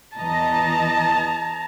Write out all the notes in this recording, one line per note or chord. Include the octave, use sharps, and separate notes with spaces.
E2 E3 D#5 A5 A#5